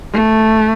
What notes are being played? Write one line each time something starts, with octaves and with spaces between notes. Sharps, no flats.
A3